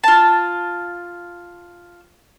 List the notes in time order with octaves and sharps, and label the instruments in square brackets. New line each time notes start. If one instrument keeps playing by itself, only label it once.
[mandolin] F4 A5